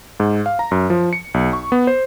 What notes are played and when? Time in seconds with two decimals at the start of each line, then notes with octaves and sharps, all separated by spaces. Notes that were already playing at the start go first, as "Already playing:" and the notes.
0.20 G#2
0.46 F5
0.59 A#5
0.71 F#2
0.90 F3
1.13 C#7
1.34 B1
1.53 C#6
1.72 B3
1.87 C5